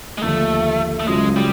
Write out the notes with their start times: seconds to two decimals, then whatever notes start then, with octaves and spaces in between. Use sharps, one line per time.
0.18 G#3
0.22 D#2 D3 F3 A3
1.00 A3
1.08 C#2 C#3 F#3 G#3
1.36 G3